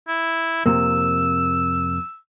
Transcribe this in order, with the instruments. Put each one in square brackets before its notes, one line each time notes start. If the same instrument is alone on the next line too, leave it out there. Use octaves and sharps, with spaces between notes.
[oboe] E4
[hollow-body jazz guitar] F2 C3 A#3 [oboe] E6